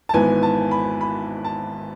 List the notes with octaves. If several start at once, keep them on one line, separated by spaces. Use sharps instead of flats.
A5
G#1 G#2 E3 B3 G#5
A5
B5
B5
A5